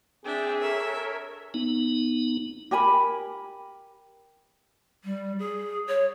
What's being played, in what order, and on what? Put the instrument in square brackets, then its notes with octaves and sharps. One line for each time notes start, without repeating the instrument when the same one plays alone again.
[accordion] C4 G5 [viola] D4 E5 [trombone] G#4
[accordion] A4 A#4 C#5 [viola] E5
[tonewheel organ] B3 D#4
[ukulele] G4 A#4 G#5 B5
[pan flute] G3
G#4
C#5